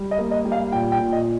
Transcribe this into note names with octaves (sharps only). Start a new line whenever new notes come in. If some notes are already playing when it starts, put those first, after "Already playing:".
Already playing: G3
D#5
A#3
D#5
G3
F5
A#2 G5
G5
A#2
D#5